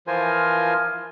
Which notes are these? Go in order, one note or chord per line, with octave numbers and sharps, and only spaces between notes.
E3 F3 F4 A#4 C5 G#5